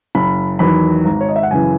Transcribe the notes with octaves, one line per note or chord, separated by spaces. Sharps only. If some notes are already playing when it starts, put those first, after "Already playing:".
F#1 B5
E2 D#3 F#3 B5
G#1 A#5
C#5
D#5
E5
F#5
F#2 C#3 E3 G#5